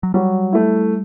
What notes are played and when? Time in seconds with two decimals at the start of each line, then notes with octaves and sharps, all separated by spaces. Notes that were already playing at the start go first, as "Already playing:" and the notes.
0.03 F#3
0.14 F#3 G3
0.53 A3 E4